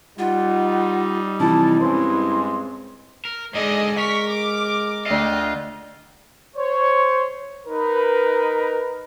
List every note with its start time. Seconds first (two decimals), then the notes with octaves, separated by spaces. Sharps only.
0.19 G3 D#4 F4 F#5
1.40 C3 E3 F3 E4 A5
1.81 G2 G#3 C4 C#4 C6
3.25 A#4
3.54 G#2 D3 G#3 D5 D#5 G#5
3.98 A#4 C#6 B6
4.30 D6
5.06 D2 F4 D#5 E5 G5
6.56 C5 C#5
7.67 D#4 A#4 B4